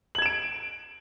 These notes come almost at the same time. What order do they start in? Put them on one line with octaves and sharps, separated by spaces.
F#7 G#6 E7 D7